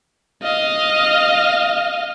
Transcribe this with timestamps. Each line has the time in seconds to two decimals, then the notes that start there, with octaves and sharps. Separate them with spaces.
0.43 D#5 F5